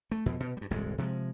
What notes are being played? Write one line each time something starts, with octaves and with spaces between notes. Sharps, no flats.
A3
F2 B2
B2
G2 G3
D#1 C2 G#2 G#3
C3 F3 F#3 G#3